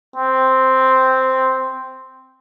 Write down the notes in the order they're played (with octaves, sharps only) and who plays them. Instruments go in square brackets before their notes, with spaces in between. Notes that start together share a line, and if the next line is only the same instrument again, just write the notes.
[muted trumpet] C4